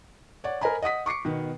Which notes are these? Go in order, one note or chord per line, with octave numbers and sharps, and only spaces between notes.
C#5 D5 F#5
A#4 C5 D#5 G#5 A#5 B5
D#5 F#5 D#6 B6
C#6 D6 C7 C#7
B2 D#3 B3